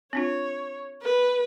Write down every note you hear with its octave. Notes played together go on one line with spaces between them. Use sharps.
C4 D4 F4 C#5
B4